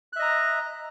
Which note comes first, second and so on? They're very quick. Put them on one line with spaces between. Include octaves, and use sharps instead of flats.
F#6 E5 D#5 A#5